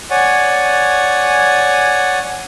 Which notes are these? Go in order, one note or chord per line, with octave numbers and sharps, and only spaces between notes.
C#5 D5 F#5 G#5